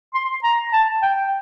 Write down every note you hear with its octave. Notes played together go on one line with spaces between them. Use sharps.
C6
A#5
A5
G5